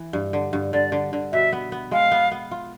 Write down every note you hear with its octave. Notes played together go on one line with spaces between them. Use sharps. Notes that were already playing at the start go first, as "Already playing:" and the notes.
Already playing: E3
G2
D3
G2
D3 D5
D3
D3
B2 E5
B3
B3
G#3 F5
B3
B3
F4